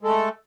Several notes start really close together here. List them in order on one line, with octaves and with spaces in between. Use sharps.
G#3 A4 A3